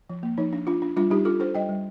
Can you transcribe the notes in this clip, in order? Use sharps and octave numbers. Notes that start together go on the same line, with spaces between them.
F3
A#3
F3 D#4
D4
D4 F4
D4
G3 D4 F4
G3 D#4 G4
D4 F4 A4
D4 A4 C5
G3 D#5 G5
G3